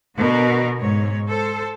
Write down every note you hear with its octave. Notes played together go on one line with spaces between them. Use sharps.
B2 D3 F#4 A#4
G#2 C#5
A4 C5